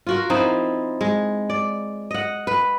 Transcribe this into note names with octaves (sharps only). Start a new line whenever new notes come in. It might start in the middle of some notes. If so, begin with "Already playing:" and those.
F4 F#4 A#4
F3 C4 D#4 E4
G#3
D5
D#5 F#5
B4